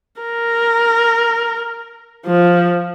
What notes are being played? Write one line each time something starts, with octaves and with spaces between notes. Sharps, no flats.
A#4
F3